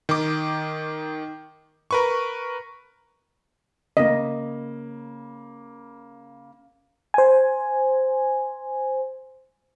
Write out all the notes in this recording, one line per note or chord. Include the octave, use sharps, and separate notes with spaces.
D#3 D6
A#4 B4 C#6
C#3 A#3 D#5
C5 G#5